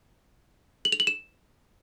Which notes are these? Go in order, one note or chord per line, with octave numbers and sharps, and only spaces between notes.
F#7
F7
F#7
E7